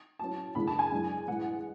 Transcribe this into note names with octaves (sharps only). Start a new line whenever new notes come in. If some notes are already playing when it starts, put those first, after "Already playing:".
A2 F#3 C#4 A5
F#1 E2 D3 G#3 B5
A5
G#5
F#2 E3 G#3 D4
A1 A2 G#3 F#5